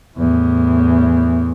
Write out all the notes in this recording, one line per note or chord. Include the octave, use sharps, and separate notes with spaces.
E2 A2